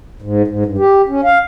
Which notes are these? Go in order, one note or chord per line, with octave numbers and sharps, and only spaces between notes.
G#2
G#2
G2
G4
C#4
F5